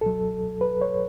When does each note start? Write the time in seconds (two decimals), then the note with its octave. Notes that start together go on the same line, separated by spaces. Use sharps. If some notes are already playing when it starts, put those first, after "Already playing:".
0.01 C#2 B2 F#3 A4
0.61 B4
0.81 C#5